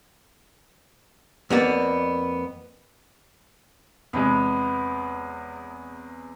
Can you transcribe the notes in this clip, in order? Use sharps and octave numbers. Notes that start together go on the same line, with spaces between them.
F2 A#3 B3 D5
E2 C3 G#3 B3 C#5